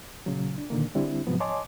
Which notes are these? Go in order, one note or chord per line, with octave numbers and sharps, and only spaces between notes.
A#2 C#3 F#3
D4
A#2 D3 D#3 A#3
D3 G3 C4 D4 E4
G#2 C3 F3 F#3 B3
C#5 D#5 G#5 A5 C6 D6